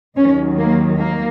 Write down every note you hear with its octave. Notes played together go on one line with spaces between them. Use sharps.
D#2 D#3 F#3 C#4
A#3
A#3